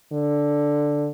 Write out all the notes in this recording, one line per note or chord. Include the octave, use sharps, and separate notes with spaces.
D3